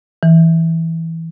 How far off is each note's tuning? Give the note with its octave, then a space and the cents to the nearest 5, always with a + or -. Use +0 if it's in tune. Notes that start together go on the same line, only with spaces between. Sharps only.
E3 -10